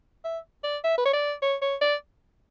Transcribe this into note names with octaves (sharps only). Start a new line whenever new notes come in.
E5
D5
E5
B4
C#5
D5
C#5
C#5
D5